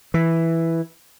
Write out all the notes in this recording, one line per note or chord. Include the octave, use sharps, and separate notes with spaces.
E3